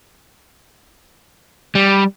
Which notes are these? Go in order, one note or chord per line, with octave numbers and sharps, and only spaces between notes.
G3